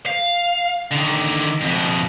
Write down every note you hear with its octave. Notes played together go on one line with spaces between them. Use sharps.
F5
D3 D#3
F2 B2